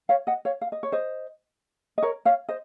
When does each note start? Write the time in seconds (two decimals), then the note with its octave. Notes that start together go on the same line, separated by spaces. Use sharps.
0.09 C#5 F5
0.27 D#5 F#5
0.45 C#5 F5
0.61 F5
0.72 D#5
0.83 C#5
0.92 C5 D#5
1.98 D#5
2.02 A#4 C#5
2.25 C#5 F5
2.49 C5 D#5